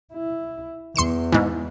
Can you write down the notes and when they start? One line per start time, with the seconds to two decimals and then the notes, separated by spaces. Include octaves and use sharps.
0.14 E4
0.96 E2 C6 C#7 E7
1.32 G#2 E3